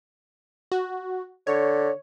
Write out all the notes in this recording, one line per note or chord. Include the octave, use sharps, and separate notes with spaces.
F#4
D3 C#5